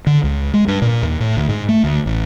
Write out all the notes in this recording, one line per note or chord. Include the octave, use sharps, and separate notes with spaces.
D3
C#2
G#3
G2
A#2
D#2
A2
D2
G#2
A3
D2
A1